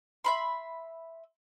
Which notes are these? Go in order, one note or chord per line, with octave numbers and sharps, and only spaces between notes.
E5 B5 C6